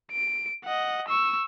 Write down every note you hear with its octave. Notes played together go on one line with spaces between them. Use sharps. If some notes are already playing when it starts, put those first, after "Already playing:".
D7
D#5 F#5
C#6 E6